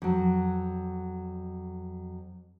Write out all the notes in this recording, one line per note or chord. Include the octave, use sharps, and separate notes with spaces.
F2 F#3